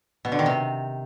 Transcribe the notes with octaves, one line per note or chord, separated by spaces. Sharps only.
B2
D3
D#3
C3